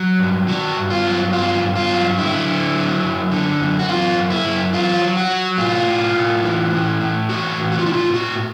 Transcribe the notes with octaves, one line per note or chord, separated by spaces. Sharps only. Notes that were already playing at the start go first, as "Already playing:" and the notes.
Already playing: F#3
G2
D#3 F#4
G2
F4
F#3
G2 F4
G2
F4
F#3
D3 E4
D3
F#3
F#2
D3
F#2
F#4
F#2 F4
F#2
E4
F#2
F#3 F4
F#3
F#4
F#3
A2 F4
A2
A2
E3
A2
A2
E3 F#4
A2
F#4
F4
A2 E4
F4
A2 F#4